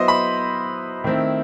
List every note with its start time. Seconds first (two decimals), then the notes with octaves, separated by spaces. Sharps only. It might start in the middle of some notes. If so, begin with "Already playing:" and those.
Already playing: F#3 B3 E4 C5 D#5
0.08 B5
1.04 D#3 A3 C4 E4